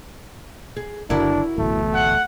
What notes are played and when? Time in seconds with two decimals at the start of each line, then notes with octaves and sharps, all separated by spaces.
0.77 G#4
1.10 F#1 D3 D4 E4 F#4 A#4
1.58 D1 A1 B2 A3
1.94 F#5